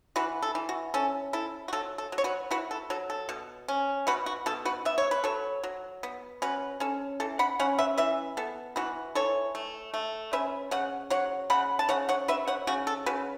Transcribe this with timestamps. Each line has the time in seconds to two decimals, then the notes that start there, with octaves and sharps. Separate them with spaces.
0.16 E3 F#4 B4
0.42 A4
0.55 E3
0.69 F#4
0.94 C#4 A4
1.33 E4 A4
1.68 F#4
1.73 F#3 A4
1.98 A4
2.12 F#3
2.18 C#5
2.24 F#4 B4
2.51 E4 F#4 B4
2.71 A4
2.90 F#3 A4
3.10 A4
3.29 B2
3.68 C#4
4.07 B2 F#4 B4
4.26 F#4
4.46 B2 A4
4.65 F#4 B4
4.85 B3 E5
4.98 C#5
5.11 B4
5.24 F#3 A4 C#5
5.64 F#3
6.03 B3
6.42 C#4 F#4 B4
6.80 C#4 A4
7.20 E3 A4
7.39 F#5 B5
7.59 C#4 C#5 F#5
7.79 B4 E5
7.98 E3 B4 E5
8.37 B3 A4
8.76 E3 F#4 B4
9.15 E3 A4 C#5
9.55 A3
9.94 A3
10.33 C#4 B4 E5
10.71 C#3 C#5 F#5
11.10 F#3 C#5 F#5
11.50 C#3 F#5 B5
11.79 A5
11.89 C#3 C#5 F#5
12.09 C#5 F#5
12.28 F#3 B4 E5
12.47 C#5 F#5
12.67 C#3 F#4
12.87 A4
13.06 C#3 F#4 B4